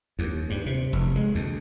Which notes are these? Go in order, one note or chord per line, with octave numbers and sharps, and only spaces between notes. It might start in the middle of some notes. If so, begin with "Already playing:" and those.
D#2
G2
C3
F1
G#3
D2